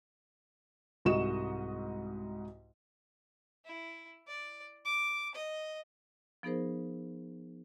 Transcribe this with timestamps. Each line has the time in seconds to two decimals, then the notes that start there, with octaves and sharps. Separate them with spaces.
1.05 C2 G#2 F#4 D#5 C#6 E7
3.65 E4
4.27 D5
4.85 D6
5.35 D#5
6.43 F3 B3 D#4 G#4 A#4 C5